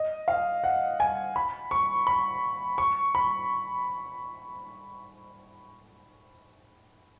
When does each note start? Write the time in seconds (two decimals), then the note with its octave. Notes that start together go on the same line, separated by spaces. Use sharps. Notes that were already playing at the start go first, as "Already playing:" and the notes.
Already playing: D#5
0.28 F5
0.64 F#5
1.00 G#5
1.36 B5
1.71 C#6
2.07 B5
2.78 C#6
3.15 B5